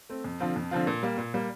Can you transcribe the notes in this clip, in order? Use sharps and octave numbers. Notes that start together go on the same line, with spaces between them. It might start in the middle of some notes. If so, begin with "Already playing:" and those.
A3 C4
F2
D3 F3 C4 F4
F2
D3 F3 C4 F4
A#2
G3 A#3
A#2
G3 A#3